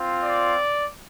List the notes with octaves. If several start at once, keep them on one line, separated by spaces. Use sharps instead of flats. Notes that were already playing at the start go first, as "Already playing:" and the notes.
Already playing: C4 F4
D5